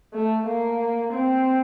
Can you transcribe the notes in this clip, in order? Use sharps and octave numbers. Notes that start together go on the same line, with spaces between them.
A3
A#3
C4